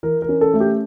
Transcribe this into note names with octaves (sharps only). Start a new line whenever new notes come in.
E3 A#4
A#4
C#4
A4
A3
G4